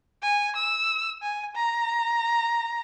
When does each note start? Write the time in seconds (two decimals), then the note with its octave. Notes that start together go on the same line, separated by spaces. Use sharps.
0.23 G#5
0.56 E6
1.22 G#5
1.55 A#5